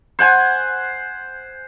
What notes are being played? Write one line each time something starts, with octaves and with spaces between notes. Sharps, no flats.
C5 F#5 G#5